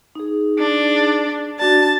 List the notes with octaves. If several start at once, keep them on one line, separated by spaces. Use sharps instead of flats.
D#4 G#4
D4
D4 F#4 D5 A5